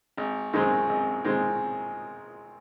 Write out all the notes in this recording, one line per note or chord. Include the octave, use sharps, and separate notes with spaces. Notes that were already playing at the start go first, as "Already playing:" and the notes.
G#1
F#2 D#3 G#3 C4
G#1
D#3 G#3 C4